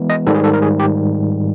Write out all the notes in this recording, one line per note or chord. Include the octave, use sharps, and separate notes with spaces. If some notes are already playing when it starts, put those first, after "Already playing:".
Already playing: E3 G#3 B3
D#5
G#2 D#3 G3 A4
G#4
A4
A#4
G#4
G4